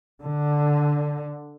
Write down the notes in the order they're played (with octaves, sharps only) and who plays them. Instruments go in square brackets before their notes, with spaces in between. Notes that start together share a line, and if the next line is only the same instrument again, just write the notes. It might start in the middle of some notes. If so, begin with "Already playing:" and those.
[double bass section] D3